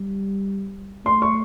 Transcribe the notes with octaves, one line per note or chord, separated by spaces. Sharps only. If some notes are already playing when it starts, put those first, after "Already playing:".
Already playing: G3
A3 C6
C#6